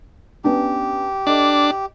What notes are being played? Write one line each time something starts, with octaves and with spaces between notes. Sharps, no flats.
B3 C#4 D4 G4
D4 A4 D#5